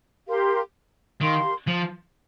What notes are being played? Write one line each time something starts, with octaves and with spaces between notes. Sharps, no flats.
G4 A#4 F5 C6
D#3 G4 A#4 F5 C6
F3